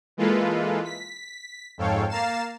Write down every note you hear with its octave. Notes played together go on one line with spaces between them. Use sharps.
E3 G#3 A#3 F4 A4 B4
B6
F2 G#2 A4 C#5 F5 G5
A#3 F5 A#5 A6 C7 E7